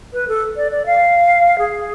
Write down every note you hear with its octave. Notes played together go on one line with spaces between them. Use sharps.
B4
A4
D5
D5
F5
G#4